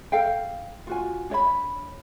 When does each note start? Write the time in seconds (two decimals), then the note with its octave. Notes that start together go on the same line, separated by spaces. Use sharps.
0.12 A4 F5 G5
0.87 F4 F#4 G#5
1.30 D4 C#5 D#5 B5